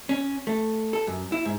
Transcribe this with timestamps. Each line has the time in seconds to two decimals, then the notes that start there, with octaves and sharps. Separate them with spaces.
0.09 C#4
0.47 A3
0.93 A4
1.07 F#2
1.32 E4
1.45 G#2